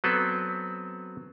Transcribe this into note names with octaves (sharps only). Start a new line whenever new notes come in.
F#3 B3 C4 A4 B4